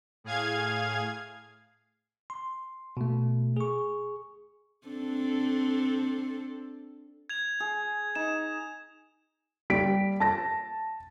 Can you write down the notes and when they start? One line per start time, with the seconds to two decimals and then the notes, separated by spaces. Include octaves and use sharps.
0.24 A2 G#4 F5 G#6
2.30 C6
2.97 B2 A3
3.57 G#4 C#6
4.87 C4 D4 A4
7.29 G#6 F7
7.60 G#4
8.15 D#4 E7
9.70 G3 B6 D7
10.20 A5 A#6